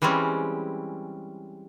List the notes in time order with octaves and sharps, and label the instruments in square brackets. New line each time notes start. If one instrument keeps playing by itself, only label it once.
[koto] E3 G3 G#3 C4 C#4